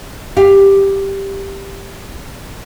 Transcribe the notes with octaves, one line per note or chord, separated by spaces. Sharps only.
G4 F5